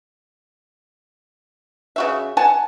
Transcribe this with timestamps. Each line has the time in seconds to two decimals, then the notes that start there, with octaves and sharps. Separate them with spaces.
1.96 C#3 F#4 E5
2.37 F#5 G#5 A5